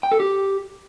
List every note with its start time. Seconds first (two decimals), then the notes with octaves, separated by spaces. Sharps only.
0.03 G5
0.12 A4
0.20 G4